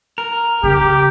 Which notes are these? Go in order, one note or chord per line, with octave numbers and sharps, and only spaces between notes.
A#4
C#3 G4